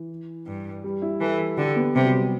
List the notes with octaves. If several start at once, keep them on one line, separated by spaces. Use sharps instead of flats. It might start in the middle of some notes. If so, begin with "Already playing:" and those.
Already playing: E3
G2
G3
E4
E3 A4
D3 G4
B3
C3 G3
F#3
G3